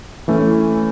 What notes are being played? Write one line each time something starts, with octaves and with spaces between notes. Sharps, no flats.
E3 A3 C#4 E4